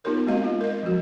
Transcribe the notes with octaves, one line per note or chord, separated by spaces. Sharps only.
B3 D#4 F4 G4 A#4 C#5
G#3 A#3 C4 F#4 D#5 F5
F4
A#4 D#5
F3 F#3 F#4